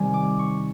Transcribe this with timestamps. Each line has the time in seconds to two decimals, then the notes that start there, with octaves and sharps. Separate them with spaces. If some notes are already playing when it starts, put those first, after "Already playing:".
Already playing: C3 D#3 G3 C4 G#5
0.14 D6
0.39 C#6